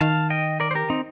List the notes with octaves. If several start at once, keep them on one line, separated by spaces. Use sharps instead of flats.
D#3 F5 A5
D#5 G5
A#4 D5
C5
G4 A#4
C4 D#4